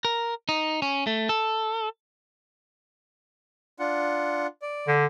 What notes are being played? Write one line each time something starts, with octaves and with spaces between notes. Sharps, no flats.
A#4
D#4
C#4
A3
A4
D4 F4 F#5
D5
D3